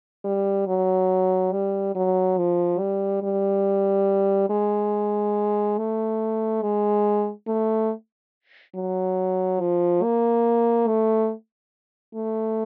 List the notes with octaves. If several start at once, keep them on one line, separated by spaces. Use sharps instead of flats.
G3
F#3
G3
F#3
F3
G3
G3
G#3
A3
G#3
A3
F#3
F3
A#3
A3
A3